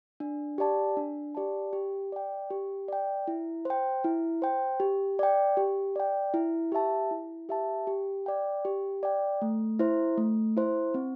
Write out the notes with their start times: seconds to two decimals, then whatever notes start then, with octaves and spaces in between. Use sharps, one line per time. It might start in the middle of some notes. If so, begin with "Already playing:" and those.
0.20 D4
0.58 G4 D5 A5
0.97 D4
1.35 G4 D5 A5
1.73 G4
2.12 D5 G5
2.50 G4
2.88 D5 G5
3.27 E4
3.65 C5 G5
4.04 E4
4.42 C5 G5
4.80 G4
5.19 D5 G5
5.57 G4
5.96 D5 G5
6.34 E4
6.72 G4 E5 A5
7.11 E4
7.49 G4 E5 A5
7.87 G4
8.26 D5 G5
8.65 G4
9.03 D5 G5
9.42 A3
9.79 E4 C5
10.18 A3
10.57 E4 C5
10.94 C4